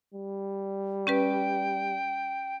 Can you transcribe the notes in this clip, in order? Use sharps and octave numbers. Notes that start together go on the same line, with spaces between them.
G3
C#4 G4 B4 G5